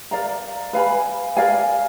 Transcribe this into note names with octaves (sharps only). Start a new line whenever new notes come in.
A#4 D5 F5 A#5
B4 F5 G#5 B5
A#4 D5 F5 G#5